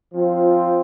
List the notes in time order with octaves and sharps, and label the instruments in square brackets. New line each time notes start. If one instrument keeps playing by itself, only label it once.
[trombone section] F3 C4 F4